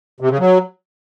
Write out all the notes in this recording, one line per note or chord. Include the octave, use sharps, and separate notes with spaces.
C3
C#3
F#3